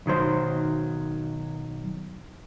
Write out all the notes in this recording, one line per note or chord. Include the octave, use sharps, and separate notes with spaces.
B1 D#3 F#3 C5